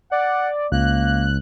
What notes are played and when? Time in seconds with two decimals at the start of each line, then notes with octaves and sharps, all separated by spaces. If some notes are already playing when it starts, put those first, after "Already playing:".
0.12 D5 F#5
0.72 C#2 A#3 F#6